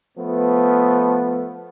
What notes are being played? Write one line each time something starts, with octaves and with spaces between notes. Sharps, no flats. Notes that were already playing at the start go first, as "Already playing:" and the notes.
F3 A3 B3